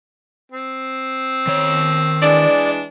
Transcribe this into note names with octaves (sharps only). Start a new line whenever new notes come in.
C4
D#3 C#5
E3 G#3 D4 D5